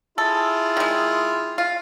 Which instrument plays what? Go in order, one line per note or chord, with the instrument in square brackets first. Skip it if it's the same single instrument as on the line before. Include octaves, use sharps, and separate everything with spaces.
[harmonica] E4 F4 G#4 [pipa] A4
[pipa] D#3 G#3
F4